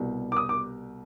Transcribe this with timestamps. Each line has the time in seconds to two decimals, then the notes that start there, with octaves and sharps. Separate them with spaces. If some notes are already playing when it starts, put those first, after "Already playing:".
Already playing: C2 B2 G3
0.32 D6
0.37 D#6
0.49 D6